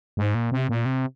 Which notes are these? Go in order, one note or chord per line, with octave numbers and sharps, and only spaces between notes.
G#2
A#2
C3
A#2
C3